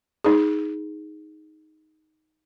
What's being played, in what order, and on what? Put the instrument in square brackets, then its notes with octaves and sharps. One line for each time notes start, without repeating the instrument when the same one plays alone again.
[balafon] D#4 G#4